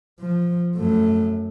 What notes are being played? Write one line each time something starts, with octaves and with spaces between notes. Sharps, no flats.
F3
F#2 A3